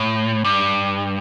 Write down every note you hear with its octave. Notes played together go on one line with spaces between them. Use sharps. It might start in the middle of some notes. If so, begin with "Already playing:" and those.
Already playing: A2
G2